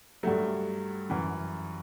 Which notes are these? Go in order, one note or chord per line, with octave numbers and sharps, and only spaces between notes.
G2 F#3 A3
F#2 E3